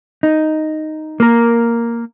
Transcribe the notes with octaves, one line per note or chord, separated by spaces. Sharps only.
D#4
A#3 A#4